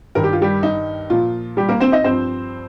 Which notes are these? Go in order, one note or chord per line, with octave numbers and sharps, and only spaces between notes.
G2 D#3 A#4
G4
F4
G3 G4
D#4
A#2 F3 F4
G3 G4
A#3 A#4
C4 C5
D#4 D#5
G2 F3 C4 C5